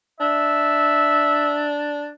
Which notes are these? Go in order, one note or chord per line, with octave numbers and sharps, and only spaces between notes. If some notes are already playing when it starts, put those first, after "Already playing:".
D4 E5